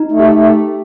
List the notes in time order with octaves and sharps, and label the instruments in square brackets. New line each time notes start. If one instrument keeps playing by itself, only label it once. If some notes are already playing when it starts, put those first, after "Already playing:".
Already playing: [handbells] D#4
[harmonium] A3
[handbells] G4
[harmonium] A3